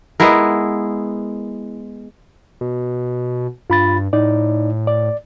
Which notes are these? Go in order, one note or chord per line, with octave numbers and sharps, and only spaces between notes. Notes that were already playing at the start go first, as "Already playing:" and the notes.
G#3 B3 E4 A#4
B2
G2 F4 B5 A6
A2 D#4 D5
D5